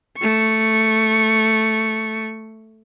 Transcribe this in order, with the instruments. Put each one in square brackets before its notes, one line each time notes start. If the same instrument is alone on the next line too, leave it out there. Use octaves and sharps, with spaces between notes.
[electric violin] A3 C#6